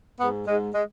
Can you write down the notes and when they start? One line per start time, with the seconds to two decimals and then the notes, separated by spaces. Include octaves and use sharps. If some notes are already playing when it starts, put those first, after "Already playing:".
0.20 G#2 B3
0.47 G#2 G#3
0.74 G#3